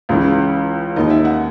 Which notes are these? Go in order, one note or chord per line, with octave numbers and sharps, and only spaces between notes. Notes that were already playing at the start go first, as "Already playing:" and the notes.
C#2 C#3 E3
D#2 D#3 D#5
E5
F#5